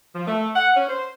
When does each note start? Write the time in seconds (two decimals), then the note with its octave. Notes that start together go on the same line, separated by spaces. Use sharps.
0.15 F3
0.27 A3
0.56 F#5
0.76 C#4
0.89 C5